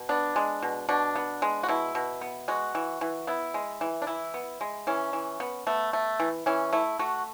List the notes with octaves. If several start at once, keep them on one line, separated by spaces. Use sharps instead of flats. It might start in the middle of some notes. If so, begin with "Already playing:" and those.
Already playing: B2
B3 D4
G#3
B2
B2 D4
B3
G#3
F#4
B2 E4
B2
B3
G#3 F#4
E3
E3
B3 E4
G#3
E3
D4
E3 E4
B3
G#3
E3 C#4
E3
B3
A3 B3
A3
E3
E3 C#4
A3 E4
A3 F#4